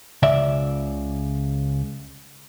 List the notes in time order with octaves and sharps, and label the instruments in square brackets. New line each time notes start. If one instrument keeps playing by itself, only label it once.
[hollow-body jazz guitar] C#2 C#3 D5 E5